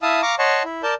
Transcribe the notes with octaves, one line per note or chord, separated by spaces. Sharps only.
E4 E5 F5 A5 D#6
F5 A#5 C#6 D6
C#5 D#5 F#5 A5 C6 C#6
E4
A#4 D5 A5 G6